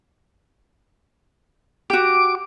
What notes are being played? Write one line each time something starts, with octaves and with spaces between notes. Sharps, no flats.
F#4 G4 D6